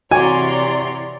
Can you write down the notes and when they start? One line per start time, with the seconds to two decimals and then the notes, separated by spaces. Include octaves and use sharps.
0.11 C3 E3 F#4 C#5 D5 G#5 A#5 C6